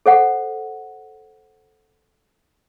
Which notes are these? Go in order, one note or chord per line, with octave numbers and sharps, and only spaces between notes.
A4 C5 F#5